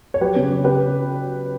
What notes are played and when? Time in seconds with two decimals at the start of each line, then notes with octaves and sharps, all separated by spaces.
0.14 C#5
0.21 F#3 G4 B4
0.36 C#3
0.50 F#3
0.64 C#3 G4 B4